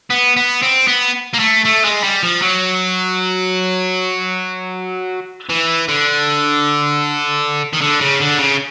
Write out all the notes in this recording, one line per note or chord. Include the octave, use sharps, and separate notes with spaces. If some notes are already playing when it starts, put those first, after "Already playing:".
B3
B3
C4
B3
A#3
A3
A3
G#3
G3
F3
F#3
E3
D3
D#3
D3
C#3
D3
C#3